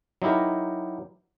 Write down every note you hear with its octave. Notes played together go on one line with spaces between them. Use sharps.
F#3 D#4 E4 G4 A#4